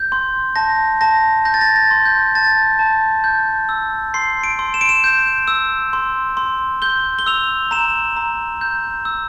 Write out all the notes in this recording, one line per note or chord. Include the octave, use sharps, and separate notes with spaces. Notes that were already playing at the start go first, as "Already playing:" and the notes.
Already playing: G6
C6
A5 A#6
A5 A#6
G6 A#6
A6
A#6
A6
C6
G6
A5 A6
A5
G6
E6
C6 C7
D7
C6
E7
D7
E7
G6
E6
C6
C6
G6 G7
G7
E6 F7
A#5 E7
A#5
G6
E6